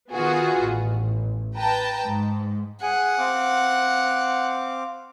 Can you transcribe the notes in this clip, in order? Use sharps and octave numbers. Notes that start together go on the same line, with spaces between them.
D#3 B3 F4 F#4 G#4
A1
B4 G5 A5 A#5
G#2
G#4 F#5 G#5
C4 F5 D6